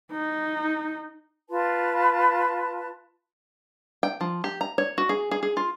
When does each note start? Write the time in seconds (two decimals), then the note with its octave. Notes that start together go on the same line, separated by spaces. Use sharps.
0.11 D#4
1.51 F4 B4 A5 C6
4.03 G5
4.21 F3
4.44 G4
4.61 A#5
4.78 C#5
4.98 F#4
5.09 G#4
5.31 G#4
5.43 G#4
5.57 F4